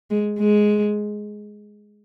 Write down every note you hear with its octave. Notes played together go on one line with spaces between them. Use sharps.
G#3
G#3